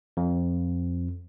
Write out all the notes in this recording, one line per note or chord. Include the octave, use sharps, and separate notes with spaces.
F2